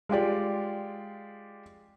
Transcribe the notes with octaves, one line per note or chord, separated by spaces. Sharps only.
G#3 F4 G4 D5